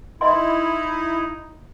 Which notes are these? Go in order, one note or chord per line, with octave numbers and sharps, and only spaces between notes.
D#4 E4 D#5 E5 C6